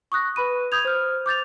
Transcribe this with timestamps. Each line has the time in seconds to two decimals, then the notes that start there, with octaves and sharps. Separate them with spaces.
0.12 C#6 D#6 F#6 A#6
0.36 B4 B5 D#7
0.72 D#6 G6 G#6 F7
0.85 C5 F6
1.26 D6 G6 A6 F7